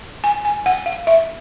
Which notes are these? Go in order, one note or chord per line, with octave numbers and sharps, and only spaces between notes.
G#5
G#5
F#5
F5
E5